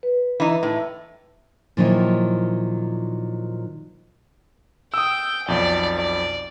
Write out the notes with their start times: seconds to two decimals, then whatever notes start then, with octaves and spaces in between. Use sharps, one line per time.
0.03 B4
0.40 E3 D#4
0.63 A2
1.77 A#2 D#3 F3 F#3 D#4 E4
4.94 G5 D#6 E6
5.48 B1 F2 D5
5.97 D5